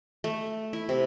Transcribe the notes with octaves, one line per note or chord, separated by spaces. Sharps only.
A3
E4
C3